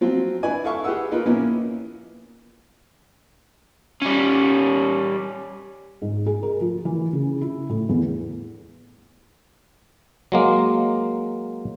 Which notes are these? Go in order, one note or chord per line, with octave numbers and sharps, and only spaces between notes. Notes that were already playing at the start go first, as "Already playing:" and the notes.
F3 F#3 C4 F4
D4 E4 B4 D5 G#5
E4 A4 E5 F5 C#6
G4 G#4 B4 F#5 E6
A#3 D#4 F4 A#4 B4
A#2 F3 A#3 B3 C#4 E4
G3 C#4
G#2
G#4
A#4
F3
E3
C#3
E4
A2
E2
F#3 G#3 A#3